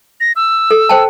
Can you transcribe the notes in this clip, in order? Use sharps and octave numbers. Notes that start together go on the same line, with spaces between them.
A#6
E6
A4
C5 G5 A5